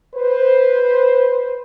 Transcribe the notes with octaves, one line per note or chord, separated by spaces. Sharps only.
B4 C5